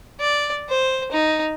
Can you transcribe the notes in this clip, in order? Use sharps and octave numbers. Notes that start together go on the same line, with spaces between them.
D5
C5
D#4